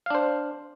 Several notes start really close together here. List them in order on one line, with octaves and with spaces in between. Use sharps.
F5 D4 C5